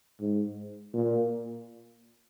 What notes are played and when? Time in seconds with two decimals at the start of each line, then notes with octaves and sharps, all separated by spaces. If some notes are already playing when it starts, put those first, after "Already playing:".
0.21 G#2
0.94 A#2